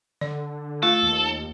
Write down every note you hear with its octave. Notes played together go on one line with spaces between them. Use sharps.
D3 D5
A3 F4 A4
D#2